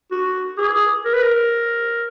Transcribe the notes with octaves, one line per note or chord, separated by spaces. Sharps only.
F#4
G#4
A#4
B4
A#4